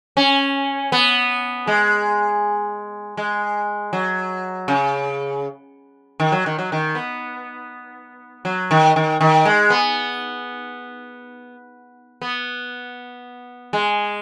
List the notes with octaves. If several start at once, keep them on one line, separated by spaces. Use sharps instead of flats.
C#4
B3
G#3
G#3
F#3
C#3
D#3
F#3
D#3
F#3
D#3
B3
F#3
D#3
D#3
D#3
G#3
B3
B3
G#3